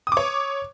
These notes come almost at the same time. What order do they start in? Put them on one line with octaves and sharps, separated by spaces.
D#6 D6 C#5